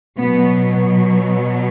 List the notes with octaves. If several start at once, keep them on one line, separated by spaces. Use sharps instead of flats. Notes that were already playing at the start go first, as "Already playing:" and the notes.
B2 F#3 B3